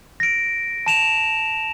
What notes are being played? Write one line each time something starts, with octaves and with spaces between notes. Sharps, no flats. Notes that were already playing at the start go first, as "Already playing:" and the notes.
A#6 D7
A5 E7 F7